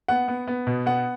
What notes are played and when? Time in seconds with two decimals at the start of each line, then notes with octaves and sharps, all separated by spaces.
0.08 B3 F#5
0.28 B3
0.47 B3
0.67 B2
0.86 B3 F#5